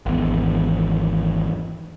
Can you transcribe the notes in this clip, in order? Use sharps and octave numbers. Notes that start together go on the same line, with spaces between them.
G#1 E2